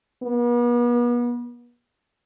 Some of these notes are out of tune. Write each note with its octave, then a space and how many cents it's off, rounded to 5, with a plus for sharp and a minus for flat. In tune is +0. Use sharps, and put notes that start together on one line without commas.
B3 -40